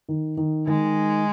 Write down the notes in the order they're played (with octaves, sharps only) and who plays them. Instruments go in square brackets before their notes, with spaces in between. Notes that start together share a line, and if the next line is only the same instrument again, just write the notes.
[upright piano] D#3
D#3
[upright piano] D#3 [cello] G#3